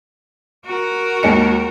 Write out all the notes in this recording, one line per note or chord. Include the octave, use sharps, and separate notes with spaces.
F#4 A#4
D#2 G#3 C#7